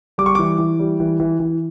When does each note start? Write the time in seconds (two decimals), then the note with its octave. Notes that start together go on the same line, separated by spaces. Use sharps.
0.18 G3 D6
0.26 C#6
0.35 E3 D6
0.58 E3
0.79 G3
1.00 E3
1.20 E3
1.40 E3